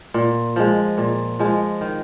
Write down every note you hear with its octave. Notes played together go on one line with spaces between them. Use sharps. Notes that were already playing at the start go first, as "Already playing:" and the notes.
A#2
F3 G#3
A#2
F3 G#3
D#3